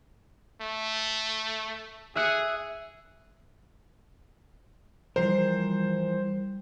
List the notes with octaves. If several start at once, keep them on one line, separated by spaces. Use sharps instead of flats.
A3
G#4 E5 F#6 C#7
E3 F3 G3 A#4 C5